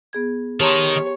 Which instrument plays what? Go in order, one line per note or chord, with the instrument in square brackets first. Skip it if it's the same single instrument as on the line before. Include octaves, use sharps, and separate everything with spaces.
[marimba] B3 G#4 G#6
[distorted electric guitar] D#3 [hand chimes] G4 [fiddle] C#5 [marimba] A5 A#5 C6